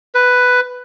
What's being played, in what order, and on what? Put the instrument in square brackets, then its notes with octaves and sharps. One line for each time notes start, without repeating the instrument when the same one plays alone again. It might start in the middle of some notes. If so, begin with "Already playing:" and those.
[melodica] B4